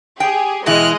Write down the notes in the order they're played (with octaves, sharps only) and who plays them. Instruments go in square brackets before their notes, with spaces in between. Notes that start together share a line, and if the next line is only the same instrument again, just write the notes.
[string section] G4 G#4 [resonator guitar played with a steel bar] G5
[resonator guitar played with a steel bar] B2 E3 E4 [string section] G#3 D#5 [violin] F6 F#6